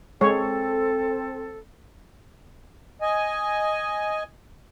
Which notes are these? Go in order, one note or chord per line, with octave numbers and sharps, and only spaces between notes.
G#3 C4 A4 C#5
D#5 G#5